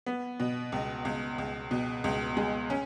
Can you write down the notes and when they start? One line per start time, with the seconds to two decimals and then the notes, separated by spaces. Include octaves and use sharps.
0.06 B3
0.40 B2
0.72 C#2
1.05 C#2
1.38 C#2
1.71 B2
2.04 C#2
2.37 G#3
2.70 C#4